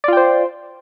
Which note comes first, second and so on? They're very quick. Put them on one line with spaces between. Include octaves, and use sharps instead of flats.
D5 F4 G5 C5